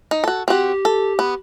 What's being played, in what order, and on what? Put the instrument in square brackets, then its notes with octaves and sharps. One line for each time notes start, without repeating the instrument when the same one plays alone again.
[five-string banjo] D#4
F#4 A4
[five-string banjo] C4 F#4 [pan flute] G4
[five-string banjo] A4
B3